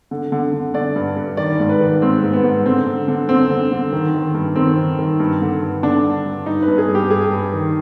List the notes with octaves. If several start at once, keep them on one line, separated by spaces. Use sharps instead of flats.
D3
D3
D3
D3 D5
G2
G2
D#3 D5
G#2
B4
D#3
G#2 C4
G#2
B3
G#2
D3 C4
D3
D3
D3 C4
D3
D3
D#3
D#3
G2
D#3 C4
D#3
D#3
G2
D3
G2
D3 D4
D3
G2
G2 D#4
B4
G2
G#4
G2
G4
G2 G#4
G2
D#3